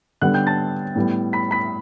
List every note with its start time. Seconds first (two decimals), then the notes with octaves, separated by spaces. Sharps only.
0.21 D3 G3 B3 F#5 F#6
0.34 G5 G6
0.47 A5 A6
0.96 A2 G3 B3
1.33 B5 B6
1.51 B5 B6